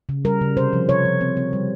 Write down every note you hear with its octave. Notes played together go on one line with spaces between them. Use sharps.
C#3
G3 A#4
C#3
C3 C5
F3
C3 C#5
F3
C4
C4
G3